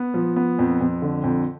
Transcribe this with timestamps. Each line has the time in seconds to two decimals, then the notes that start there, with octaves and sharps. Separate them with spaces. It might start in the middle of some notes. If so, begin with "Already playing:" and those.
Already playing: B3
0.14 F3
0.36 B3
0.59 F2
0.81 F2
1.02 D3
1.24 F2